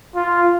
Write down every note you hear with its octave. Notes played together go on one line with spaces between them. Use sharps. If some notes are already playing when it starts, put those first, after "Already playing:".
F4